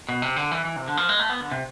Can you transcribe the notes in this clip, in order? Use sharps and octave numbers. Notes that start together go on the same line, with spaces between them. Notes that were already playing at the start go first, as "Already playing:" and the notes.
B2
C3
D3
E3
E3
C3
D3
F3
G#3
A3
B3
D3
C3